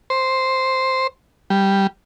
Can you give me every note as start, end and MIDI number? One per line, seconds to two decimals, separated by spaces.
0.10 1.07 72
1.50 1.87 55